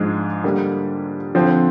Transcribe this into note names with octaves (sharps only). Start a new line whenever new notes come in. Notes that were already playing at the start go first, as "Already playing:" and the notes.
Already playing: G#2 F3 G#3 D4
D3 G3 A#3
D3 F3 C4